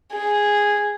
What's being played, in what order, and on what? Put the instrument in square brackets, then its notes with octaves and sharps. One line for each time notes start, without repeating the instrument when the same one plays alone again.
[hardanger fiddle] G#4